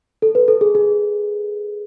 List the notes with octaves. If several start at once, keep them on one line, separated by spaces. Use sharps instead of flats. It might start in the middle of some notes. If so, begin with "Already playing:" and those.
A4
B4
A4
G#4
G#4